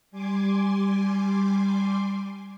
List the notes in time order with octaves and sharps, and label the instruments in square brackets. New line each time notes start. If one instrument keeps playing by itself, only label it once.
[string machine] G3 G#5 C6 D6